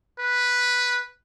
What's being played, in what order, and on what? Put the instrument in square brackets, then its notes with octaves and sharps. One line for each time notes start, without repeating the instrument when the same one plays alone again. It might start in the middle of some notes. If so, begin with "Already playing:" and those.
[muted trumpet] B4